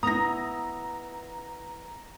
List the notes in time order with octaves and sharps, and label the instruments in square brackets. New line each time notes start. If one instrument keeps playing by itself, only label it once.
[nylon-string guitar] B3 E4 [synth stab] A#5 [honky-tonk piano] D#6 A#6